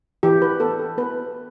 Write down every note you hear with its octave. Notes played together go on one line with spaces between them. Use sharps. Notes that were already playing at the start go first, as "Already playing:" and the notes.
E3 G4
B4
B3 A4
A4
B3 B4